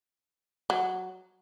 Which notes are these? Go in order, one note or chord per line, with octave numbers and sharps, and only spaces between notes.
F#3